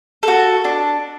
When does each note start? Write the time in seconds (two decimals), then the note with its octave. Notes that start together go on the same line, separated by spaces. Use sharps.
0.23 F#4 A4
0.64 D4